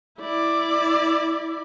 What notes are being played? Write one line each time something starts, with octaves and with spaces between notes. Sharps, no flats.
E4 D5